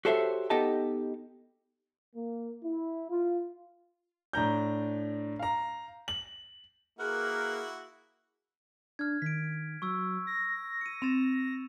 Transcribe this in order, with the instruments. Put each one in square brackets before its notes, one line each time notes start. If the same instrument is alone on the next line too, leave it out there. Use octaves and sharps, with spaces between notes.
[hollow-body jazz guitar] F#4 G4 A4 C5 C#5 E5
B3 D#4 G4 A4 D#5 A5
[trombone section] A#3
E4
F4
[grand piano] A2 D4 A#5 G6
F5 A#5
F#7
[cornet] A#3 [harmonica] E4 F#4 [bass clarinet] G#4 [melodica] A#4 B4
[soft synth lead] D4 [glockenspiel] F6 G#6
[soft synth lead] D#3 [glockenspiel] B6 D7
[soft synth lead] F#3 [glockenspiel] C#6 E6
[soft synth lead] A#6
[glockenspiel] C#7 D#7
[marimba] C4 [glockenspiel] A6 E7 F7